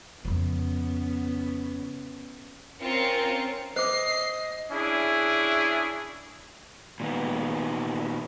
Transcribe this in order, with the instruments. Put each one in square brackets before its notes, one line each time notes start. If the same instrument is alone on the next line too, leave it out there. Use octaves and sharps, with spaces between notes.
[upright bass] F2 C#3 [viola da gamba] B3 C#4
[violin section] C4 C#4 F4 A#4 C#7
[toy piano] C5 D6 [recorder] D#5 [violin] C7
[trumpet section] C#4 D4 E4 G#4
[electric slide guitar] A#2 D#3 B3